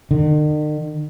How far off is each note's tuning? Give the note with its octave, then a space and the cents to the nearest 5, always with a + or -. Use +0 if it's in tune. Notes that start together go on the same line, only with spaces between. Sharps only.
D#3 -45